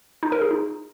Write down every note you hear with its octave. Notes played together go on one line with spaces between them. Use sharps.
D#4
A#4
G#4
D#4